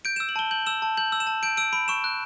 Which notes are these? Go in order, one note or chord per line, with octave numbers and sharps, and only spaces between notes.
G6 D7
E7
E6
F#7
A5 G7
G6 F#7
E6 E7
A5
G6 F#7
E6
E7
A5
G6 D7
E6 D7
B5 D7
C#6 E7
F#6